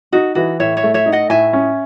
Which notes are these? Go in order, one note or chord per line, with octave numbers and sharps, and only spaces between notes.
D#4 F#4
E3 F#4
A2 C#5 E5
C#5 E5
A3
C#5 E5
D#4
D#5 F#5
A2 E5 G#5
C#4